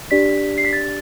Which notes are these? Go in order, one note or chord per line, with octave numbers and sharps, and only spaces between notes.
D4 G4 D5 B6
C7
B6
A6